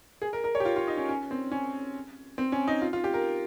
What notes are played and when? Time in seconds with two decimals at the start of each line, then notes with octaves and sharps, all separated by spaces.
0.22 G#4
0.33 A#4
0.44 A#4
0.55 C#5
0.60 G4
0.65 F4
0.76 F4
0.87 D#4
0.97 C#4
1.09 C#4
1.31 C4
1.52 C#4
2.38 C4
2.52 C#4
2.68 D#4
2.82 F4
2.93 F4
3.04 G4
3.13 A#4